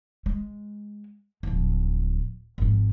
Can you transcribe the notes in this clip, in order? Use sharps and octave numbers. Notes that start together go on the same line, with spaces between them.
G#3
D1 F3
G#1 F3